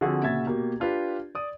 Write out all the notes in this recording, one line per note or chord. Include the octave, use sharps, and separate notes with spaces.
D3 F3 C4 F#4 G#4 A4
A#2 C#3 F#4 E5 G#6 A6
B2 A#3 G4
D4 F4 G4 B4
D5 D#6